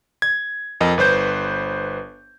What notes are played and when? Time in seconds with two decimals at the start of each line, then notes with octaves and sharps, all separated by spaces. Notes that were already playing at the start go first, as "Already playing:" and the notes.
0.22 G#6
0.81 F2 A#4 D#5
0.98 G1 B4 C5 G6